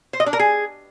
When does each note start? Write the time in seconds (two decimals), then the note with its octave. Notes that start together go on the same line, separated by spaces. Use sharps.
0.13 C5
0.20 D#5
0.26 D4
0.33 A#4
0.39 G#4